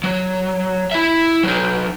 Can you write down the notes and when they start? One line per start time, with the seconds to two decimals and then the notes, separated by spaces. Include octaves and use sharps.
0.04 F#3
0.92 E4 E5
1.43 F#3 D#4